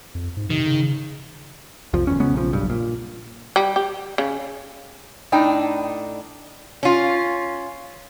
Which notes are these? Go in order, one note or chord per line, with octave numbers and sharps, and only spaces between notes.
F2
G#2
C3 D#3
C#3
C2 F2 F3
F#1 E2 C#4
C#3 G#3 B3 C#4
B1 C#3 F3
F#1 B1 G2
A#2
G3
G4
C#3
A2 D4 D#4 G5
C#4 F4